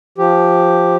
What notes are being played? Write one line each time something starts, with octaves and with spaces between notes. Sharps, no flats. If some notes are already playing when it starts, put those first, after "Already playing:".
F3 G4